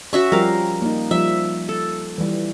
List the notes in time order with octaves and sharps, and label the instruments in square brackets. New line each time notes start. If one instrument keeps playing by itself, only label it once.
[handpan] C#4 [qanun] F#4 E5 C#6
[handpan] F3 G3 G4 [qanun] A#4 F5
[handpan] A#3 D#4
[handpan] F3 G3 [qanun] E5
[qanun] A4
[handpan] E3 G3